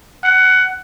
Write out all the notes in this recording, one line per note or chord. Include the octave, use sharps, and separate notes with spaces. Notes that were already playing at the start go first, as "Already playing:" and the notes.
F#5